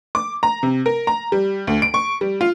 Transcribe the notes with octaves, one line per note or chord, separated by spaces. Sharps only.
D6
A#5
C3
A#4
A#5
G3
D2
D7
C#6
G3
F4